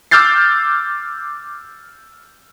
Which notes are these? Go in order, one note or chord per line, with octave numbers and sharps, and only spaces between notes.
D6 E6 F6 G6 A6 C7